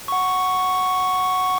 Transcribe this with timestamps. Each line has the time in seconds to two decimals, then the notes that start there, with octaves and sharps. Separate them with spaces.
0.08 F#5 C#6